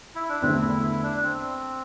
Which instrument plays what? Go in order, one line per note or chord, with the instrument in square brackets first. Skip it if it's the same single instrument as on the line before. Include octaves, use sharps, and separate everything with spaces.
[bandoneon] E4
D4
[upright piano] E2 D3 A3 [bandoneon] C4
[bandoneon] E4
E4
D4
C4